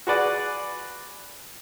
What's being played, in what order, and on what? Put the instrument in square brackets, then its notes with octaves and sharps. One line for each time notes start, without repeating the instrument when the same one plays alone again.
[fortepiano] F#4 G#4 B4 D5 F#5